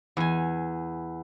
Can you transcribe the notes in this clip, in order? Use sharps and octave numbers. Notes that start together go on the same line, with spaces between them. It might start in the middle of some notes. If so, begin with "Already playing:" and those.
E2 G#5